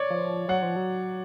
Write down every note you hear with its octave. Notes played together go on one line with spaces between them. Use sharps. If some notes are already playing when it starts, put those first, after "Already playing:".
Already playing: C#5 D5
F3
F#3 F#5
F3
F#3